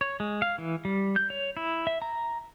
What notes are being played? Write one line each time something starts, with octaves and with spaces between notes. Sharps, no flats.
C#5
G#3
F5
E3
G3
G6
C#5
E4
E5
A#5